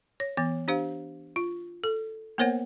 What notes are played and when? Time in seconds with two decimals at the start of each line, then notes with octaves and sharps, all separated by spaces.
0.20 C#5
0.37 E3 B3 C#5
0.68 D4 G4 C5 F5
1.36 F4
1.84 A4
2.38 A#3 B3 A#4 C5 C#5 F#5